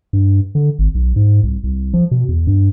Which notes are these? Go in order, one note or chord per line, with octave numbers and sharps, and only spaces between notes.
G2
D3
G#1
B1
G#2
C2
C2
F3
B2
E2
G2